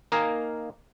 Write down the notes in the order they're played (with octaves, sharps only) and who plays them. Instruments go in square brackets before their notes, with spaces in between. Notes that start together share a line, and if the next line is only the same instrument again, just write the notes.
[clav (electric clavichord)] A#3 D#4 A#4 D#5 F5 G#5